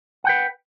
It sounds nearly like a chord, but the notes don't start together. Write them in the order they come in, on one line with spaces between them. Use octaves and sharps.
F#5 G5 B4